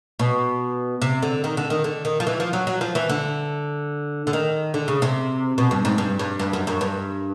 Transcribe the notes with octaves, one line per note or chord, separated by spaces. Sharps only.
B2
C3
D3
D#3
D3
D#3
D3
D#3
F3
E3
F3
F#3
F#3
F3
E3
D3
D3
D#3
D3
C#3
C3
B2
G2
G#2
G2
G2
G2
F#2
F#2
G2